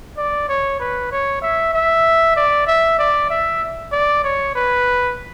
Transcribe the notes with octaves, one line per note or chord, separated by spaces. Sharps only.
D5
C#5
B4
C#5
E5
E5
D5
E5
D5
E5
D5
C#5
B4